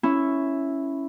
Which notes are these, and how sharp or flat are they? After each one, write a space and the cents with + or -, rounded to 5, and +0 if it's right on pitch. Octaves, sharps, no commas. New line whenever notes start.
C#4 +0 E4 +0